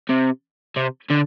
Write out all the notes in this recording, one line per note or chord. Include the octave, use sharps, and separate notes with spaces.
C3
C3
D3